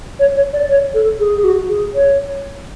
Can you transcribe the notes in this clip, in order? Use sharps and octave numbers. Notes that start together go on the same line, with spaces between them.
C#5
C#5
D5
C#5
A4
G#4
G#4
F#4
G#4
C#5